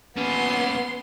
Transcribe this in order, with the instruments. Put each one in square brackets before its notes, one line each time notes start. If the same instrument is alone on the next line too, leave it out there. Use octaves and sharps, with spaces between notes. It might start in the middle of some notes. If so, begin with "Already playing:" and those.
[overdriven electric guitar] A#2 C#4 [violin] B3 C6